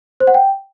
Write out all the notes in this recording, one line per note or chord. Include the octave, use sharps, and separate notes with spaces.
C5
F#5
G5